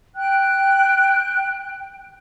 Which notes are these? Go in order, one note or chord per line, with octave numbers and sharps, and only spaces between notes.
G5 F#6